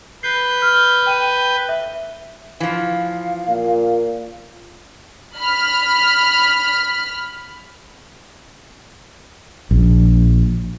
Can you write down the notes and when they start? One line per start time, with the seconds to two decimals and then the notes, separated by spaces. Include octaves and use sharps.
0.23 B4 G6 C7
0.62 F6
1.07 G5 D#7 G7
1.69 E5
2.60 E3 F3 F5
3.48 A#2
5.37 B5 F6
9.71 A#1